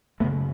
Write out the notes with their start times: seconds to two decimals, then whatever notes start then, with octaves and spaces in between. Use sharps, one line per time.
0.20 F#2 A3 B3
0.24 C#3